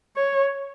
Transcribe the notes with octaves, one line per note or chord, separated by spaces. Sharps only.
C#5